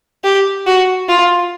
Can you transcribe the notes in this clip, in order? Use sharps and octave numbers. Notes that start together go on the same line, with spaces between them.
G4
F#4
F4